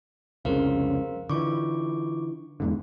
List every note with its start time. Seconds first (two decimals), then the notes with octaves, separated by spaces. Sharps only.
0.45 C2 F2 C#3 A#4 C5 F5
1.30 D3 E3 F4 C#6 D6
2.60 E2 G#2 D3